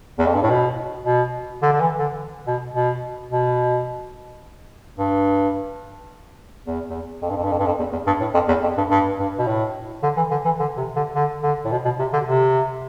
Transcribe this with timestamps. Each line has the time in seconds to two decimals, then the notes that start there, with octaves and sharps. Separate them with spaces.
0.18 E2
0.26 F2
0.34 G2
0.42 A2
0.50 B2
1.05 B2
1.62 D3
1.73 D3
1.81 E3
1.99 D3
2.47 B2
2.74 B2
3.30 B2
4.98 G2
6.67 E2
6.89 E2
7.22 F2
7.30 G2
7.37 F2
7.44 G2
7.52 F2
7.59 G2
7.66 F2
7.79 E2
7.92 E2
8.07 G2
8.21 A2
8.34 F2
8.48 E2
8.63 F2
8.77 G2
8.90 G2
9.19 G2
9.38 B2
9.47 A2
10.03 D3
10.16 E3
10.31 D3
10.45 E3
10.59 D3
10.77 C3
10.96 D3
11.15 D3
11.43 D3
11.65 A2
11.71 B2
11.85 B2
11.99 C3
12.13 D3
12.27 C3